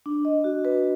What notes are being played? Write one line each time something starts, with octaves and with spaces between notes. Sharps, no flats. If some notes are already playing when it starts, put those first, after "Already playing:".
D4
D#5
F#4
B4